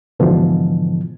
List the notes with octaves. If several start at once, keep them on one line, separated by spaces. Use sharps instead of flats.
G#2 B2 D3 E3 F3